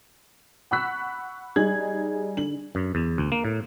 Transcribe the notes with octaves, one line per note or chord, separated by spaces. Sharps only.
F#5 B5 C#6 E6 F#6 B6
G3 D#4 G#4 G#6 F#7
D3 F#7
F#2
E2
D2
A#3
A2